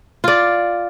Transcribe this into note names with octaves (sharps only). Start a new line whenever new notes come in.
F4 D5